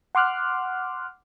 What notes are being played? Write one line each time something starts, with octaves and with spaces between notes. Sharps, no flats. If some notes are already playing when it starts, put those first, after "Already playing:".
F#5 C6 D6 F6 F#6